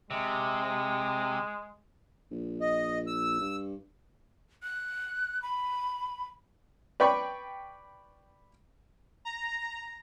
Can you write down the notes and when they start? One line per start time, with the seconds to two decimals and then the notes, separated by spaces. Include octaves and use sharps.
0.11 C3 G#3
2.31 A#1
2.61 D#5
3.07 E6
3.40 G2
4.63 F#6
5.42 B5
7.00 B4 D5 G5 B5 C#6
9.25 A#5